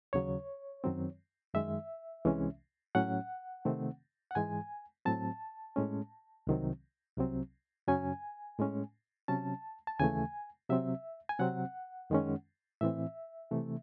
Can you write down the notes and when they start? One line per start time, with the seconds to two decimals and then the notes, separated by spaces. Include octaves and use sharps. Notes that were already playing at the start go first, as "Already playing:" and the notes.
0.13 D#2 C#3 F#3 C#5
0.84 F#2 D#3 F#3 C4
1.54 F#2 D#3 G#3 E5
2.25 C2 C3 E3 G#3 C#4
2.95 A2 F#3 C#4 F#5
3.65 C3 D#3 A3 C4
4.31 F#5
4.35 G#2 E3 G#3 G#5
5.06 A2 F#3 C4 A5
5.76 A2 G#3 C#4
6.47 C2 C3 D#3 F#3 C4
7.17 C2 C3 F#3 C4
7.87 F#2 C#3 F#3 C#4 G#5
8.59 A2 G#3 C#4
9.28 C3 F#3 C#4 A5
9.87 A5
10.00 D#2 C#3 E3 A3 G#5
10.69 C3 F#3 C4 E5
11.29 G#5
11.39 C3 F#3 C4 F#5
12.10 F#2 D#3 G#3 C#4
12.81 A2 E3 C4 E5
13.51 C3 E3 A3